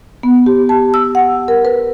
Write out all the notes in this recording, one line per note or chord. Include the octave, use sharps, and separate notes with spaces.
B3
G4
A5
E6
F#5
A#4
B4